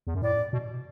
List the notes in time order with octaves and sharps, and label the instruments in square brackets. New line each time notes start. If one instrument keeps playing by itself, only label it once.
[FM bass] E2
F#2
[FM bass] A2 [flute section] D5
[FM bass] B2